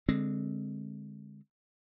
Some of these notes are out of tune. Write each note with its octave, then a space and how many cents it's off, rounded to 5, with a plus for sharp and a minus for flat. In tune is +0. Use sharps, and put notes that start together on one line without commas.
D3 +0 G#3 -15 C4 +5